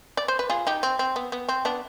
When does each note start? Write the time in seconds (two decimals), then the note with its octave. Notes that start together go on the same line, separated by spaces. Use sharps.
0.17 D5
0.28 C5
0.39 B4
0.50 F4 G#4
0.67 D#4 G4
0.83 C4
0.99 C4
1.16 B3
1.32 B3
1.49 C4
1.65 B3 D4